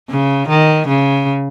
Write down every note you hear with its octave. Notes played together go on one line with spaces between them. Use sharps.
C#3
D#3
C#3